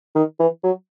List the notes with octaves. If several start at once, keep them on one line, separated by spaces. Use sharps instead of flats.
D#3
E3
F#3